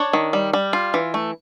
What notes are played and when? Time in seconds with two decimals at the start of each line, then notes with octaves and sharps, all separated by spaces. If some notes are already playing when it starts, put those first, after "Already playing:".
Already playing: D4 C#5
0.13 D#3
0.33 G3
0.53 G3
0.73 F4
0.94 E3
1.14 A3